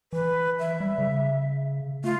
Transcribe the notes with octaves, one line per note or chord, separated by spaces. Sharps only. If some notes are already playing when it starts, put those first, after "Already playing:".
E3 B4
E5
G3
C#3
A3 F4